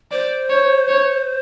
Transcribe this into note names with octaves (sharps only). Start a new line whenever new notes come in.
C5 D5
C#5
C#5